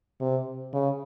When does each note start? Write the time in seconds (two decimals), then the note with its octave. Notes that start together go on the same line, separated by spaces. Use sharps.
0.20 C3
0.73 C#3